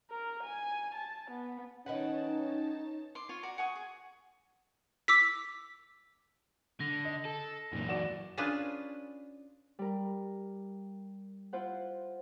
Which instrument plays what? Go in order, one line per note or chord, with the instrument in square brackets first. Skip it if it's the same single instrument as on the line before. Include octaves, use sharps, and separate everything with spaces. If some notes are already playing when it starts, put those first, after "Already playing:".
[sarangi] A#4
G#5
A5
B3
[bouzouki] D#3 B4 F#5 [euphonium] C#4 [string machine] D#4 A5 [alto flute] C#5
[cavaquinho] C6 D6
F4 C#5 C6
F#4 D5 A#5
F#5 G#5 C#6 D#6
G#4
[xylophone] D6 E6 B6
[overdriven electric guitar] D3 [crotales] A#6
[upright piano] D#5
[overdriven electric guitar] A4
[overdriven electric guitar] F#2 E3 [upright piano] A#2
[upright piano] F#4 D5 E7
[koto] C#4 D4 F4 G#4 B4
[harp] G3 A#4
E4 F4 C5 F#5